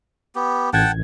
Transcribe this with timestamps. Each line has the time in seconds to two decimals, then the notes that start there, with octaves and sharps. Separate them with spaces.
0.35 B3 G4
0.73 A1 F#5 G5 A5 G#6